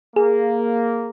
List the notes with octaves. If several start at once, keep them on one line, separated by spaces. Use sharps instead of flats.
A#3 G#4